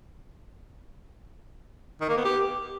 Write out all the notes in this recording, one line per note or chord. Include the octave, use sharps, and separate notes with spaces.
D#3
A#3
B3
G4